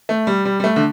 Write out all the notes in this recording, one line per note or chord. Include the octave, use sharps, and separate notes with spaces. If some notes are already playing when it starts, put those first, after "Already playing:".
A3
G3
G3
G3
A3
D3